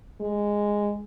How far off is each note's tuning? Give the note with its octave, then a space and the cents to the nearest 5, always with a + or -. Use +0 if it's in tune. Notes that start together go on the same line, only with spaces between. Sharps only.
G#3 -10